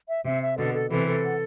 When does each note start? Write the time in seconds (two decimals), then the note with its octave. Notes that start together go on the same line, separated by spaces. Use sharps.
0.08 E5
0.25 C3 E5
0.41 E5
0.57 B2 D3 A4
0.74 A4
0.91 C3 E3 A4
1.07 A4
1.23 F#5